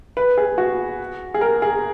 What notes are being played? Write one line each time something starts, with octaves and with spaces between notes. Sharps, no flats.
B4
G#4
F#4
G#4
A#4
G#4